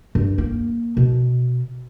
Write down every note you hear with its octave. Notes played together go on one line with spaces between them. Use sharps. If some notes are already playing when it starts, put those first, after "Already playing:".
G2
A#3
B2